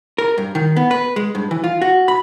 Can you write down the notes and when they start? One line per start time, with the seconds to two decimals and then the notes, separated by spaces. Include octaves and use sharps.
0.18 A#4
0.38 G2
0.55 D#3
0.76 B3
0.91 B4
1.16 G#3
1.35 G2
1.51 E3
1.64 F4
1.81 F#4
2.08 B5